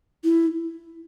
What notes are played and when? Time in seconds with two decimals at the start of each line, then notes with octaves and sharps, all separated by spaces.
0.24 E4